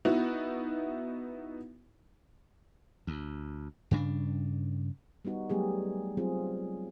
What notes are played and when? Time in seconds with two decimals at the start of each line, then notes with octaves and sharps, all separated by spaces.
0.05 B3 D#4 E4 F#4
3.07 D2
3.91 G2 C#3 C4 D4
5.25 G3 B3 D#4 F#4
5.49 F#3 G3 A3 B3 G4 G#4
6.17 F#3 G3 C4 F4 G#4